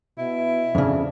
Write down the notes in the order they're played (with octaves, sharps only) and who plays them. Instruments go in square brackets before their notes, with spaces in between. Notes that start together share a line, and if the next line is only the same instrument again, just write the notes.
[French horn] B2 [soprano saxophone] E4
[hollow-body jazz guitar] F2 C#3 [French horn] D4